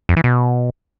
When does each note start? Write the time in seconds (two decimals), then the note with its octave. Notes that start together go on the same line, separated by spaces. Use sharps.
0.09 F2
0.16 E3
0.24 B2